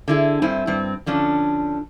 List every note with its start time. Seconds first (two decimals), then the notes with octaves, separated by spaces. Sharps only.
0.08 D3 E4 G#4
0.42 G2 C4 E4 G#5
0.67 G2 C4
1.06 D3 F3 C#4 D4